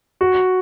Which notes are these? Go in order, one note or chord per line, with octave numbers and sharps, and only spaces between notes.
F#4